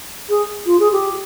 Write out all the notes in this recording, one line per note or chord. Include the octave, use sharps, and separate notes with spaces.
G#4
F4
G#4
G4